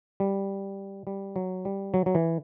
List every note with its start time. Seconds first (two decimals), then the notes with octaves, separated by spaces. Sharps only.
0.20 G3
1.07 G3
1.36 F#3
1.65 G3
1.94 F#3
2.06 F#3
2.15 E3